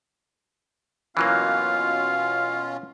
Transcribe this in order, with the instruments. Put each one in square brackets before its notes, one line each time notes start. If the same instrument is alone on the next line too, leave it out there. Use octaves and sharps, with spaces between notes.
[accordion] B2 C#4 F4 [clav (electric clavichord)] E3 F#3 A#3 [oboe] F5